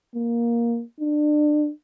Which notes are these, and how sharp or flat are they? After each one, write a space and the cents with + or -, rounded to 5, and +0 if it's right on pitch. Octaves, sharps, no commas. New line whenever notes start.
A#3 +10
D4 +30